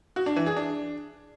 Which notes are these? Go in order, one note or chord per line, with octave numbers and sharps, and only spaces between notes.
F#4
D4
E3
G#4
D4